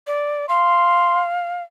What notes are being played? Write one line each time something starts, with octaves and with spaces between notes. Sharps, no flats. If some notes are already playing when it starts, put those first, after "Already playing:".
D5
F5 C6